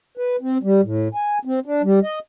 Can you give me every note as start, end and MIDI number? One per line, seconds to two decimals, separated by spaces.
0.17 0.36 71
0.41 0.58 60
0.63 0.81 55
0.83 1.08 45
1.15 1.38 80
1.45 1.60 60
1.66 1.82 62
1.83 1.99 55
2.03 2.19 75